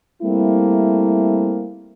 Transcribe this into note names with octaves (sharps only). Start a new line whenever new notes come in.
G3 A3 A#3 C4 E4